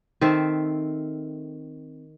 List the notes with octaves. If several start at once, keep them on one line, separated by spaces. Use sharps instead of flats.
D#3 C4 A4 E5